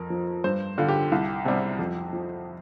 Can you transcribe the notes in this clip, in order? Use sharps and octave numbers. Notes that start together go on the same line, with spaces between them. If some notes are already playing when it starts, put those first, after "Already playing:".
Already playing: F2 A#4
F3
G2 C5
D3 G3 F4
G4
C2
C3 G3
F2
F3